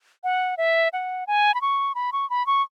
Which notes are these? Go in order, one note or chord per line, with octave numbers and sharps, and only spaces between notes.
F#5
E5
F#5
G#5
B5
C#6
B5
C#6
B5
C#6